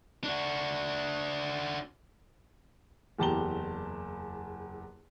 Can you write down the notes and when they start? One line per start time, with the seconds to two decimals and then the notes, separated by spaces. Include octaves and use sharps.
0.24 D4 F#4
3.19 F#1 E2 G4 A5 A#5 G7